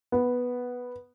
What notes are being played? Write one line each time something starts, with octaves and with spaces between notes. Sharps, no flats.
B3